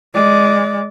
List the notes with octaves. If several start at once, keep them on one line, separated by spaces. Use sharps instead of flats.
G#3 D5